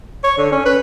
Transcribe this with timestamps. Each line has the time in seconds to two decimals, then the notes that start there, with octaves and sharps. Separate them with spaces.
0.24 C#5
0.38 D3
0.52 C#4
0.66 B4